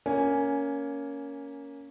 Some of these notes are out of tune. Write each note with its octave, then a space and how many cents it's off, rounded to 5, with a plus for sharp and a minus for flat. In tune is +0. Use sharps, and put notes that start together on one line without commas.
A#3 +0 C#4 +10 G#5 +0